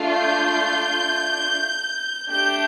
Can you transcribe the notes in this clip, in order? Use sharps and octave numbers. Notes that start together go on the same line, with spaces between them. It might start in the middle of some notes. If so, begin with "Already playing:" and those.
Already playing: A3 D4 F4
G6
A3 D4 G4 G6